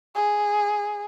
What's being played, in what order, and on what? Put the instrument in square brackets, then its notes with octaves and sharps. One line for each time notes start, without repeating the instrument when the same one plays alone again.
[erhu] G#4